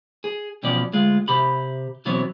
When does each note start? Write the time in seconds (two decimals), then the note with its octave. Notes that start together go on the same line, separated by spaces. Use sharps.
0.24 G#4
0.63 B1 E2 B2 F3 C#4 D5
0.93 D2 G#3 F4
1.28 C3 G4 B5
2.05 B2 E3 F#3 B3 C4 C#5